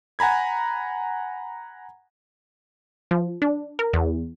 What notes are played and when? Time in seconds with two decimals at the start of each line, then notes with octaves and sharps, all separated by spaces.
0.19 F#5 G#5 A#5 B5 G#6
3.11 F3
3.42 D4
3.79 A#4
3.93 E2